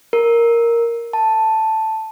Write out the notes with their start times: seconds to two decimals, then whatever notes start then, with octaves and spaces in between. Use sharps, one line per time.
0.13 A#4
1.13 A5